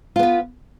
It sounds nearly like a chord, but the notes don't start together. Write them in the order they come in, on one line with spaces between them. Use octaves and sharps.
F4 B3 B4